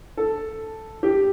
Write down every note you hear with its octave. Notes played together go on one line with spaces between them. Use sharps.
A4
G4